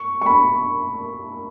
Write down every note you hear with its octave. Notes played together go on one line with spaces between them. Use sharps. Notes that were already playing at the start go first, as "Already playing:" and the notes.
Already playing: C#6
C#6
B5